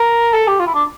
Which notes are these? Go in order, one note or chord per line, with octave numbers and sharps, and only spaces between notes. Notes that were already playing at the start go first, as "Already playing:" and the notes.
Already playing: A#4
A4
G4
F4
E4
D4